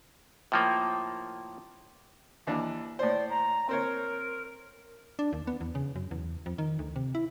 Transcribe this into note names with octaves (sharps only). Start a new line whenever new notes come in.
A2 F3 A#3
D#2 E3 D4
A2 C5 D5
A#5
C4 A#4 C5 C#5
D4
D#2
B3
E2
C#3
F#2
E2
F2
D#3
D2
C3
E4